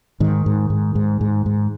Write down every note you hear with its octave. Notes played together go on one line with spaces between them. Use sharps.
G#2 D#3
G#2
G#2
G#2
G#2
G#2